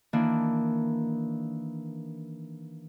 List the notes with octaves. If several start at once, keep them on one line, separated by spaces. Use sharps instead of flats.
D#3 E3 A#3 D4